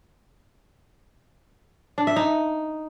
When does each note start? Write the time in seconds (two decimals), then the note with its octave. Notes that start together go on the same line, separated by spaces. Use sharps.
1.98 D4
2.07 E5
2.16 D#4